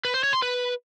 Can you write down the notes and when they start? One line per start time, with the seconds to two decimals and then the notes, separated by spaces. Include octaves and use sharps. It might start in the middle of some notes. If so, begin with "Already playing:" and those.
0.05 B4
0.14 C5
0.24 C#5
0.33 C6
0.42 B4